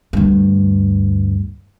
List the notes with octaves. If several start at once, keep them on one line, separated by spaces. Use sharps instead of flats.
D2 G2